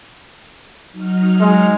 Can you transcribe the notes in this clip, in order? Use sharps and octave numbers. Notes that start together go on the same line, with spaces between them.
F#3 D#4 F6
G#3